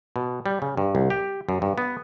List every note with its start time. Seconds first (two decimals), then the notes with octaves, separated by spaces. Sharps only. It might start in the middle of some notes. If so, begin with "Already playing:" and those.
0.16 B2
0.46 G3
0.62 C#3
0.77 G2
0.95 C2
1.10 G4
1.49 F#2
1.62 G2
1.78 B3